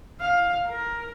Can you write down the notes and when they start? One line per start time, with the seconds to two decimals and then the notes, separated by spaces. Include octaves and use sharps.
0.20 F5
0.65 A#4